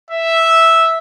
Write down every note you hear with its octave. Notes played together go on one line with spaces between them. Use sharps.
E5